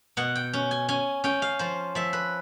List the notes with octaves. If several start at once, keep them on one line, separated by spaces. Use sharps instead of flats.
B2 F#5
G5
C#4
G#5
C#4 G#5
C#4 G5
F5
F3 C5
F3 E5
B4